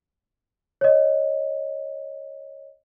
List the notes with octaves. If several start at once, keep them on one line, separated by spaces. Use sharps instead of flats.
C#5 D#5